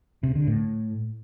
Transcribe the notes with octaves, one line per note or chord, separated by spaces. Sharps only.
C3
D3
A2